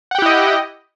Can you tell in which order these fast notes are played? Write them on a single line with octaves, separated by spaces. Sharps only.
F#5 G5 G4 E4 D#5